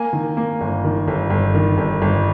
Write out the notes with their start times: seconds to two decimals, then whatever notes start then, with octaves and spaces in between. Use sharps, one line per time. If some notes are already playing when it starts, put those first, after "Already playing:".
Already playing: A#3 G#5
0.13 D#3
0.37 A#3
0.61 G1
0.84 D#3
1.07 G1
1.30 G1
1.55 D#3
1.78 G1
2.02 G1